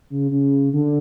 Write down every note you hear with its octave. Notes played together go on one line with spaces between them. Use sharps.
C#3
C#3
D3